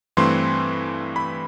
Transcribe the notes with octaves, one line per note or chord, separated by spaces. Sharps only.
G2 E3 A3 C4 C6
B5